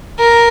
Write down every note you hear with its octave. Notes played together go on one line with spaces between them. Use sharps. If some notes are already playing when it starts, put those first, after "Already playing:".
A#4